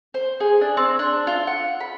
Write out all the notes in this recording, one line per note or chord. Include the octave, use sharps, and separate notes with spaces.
C5
G#4
D4
C4
D4
F4
F#5
B5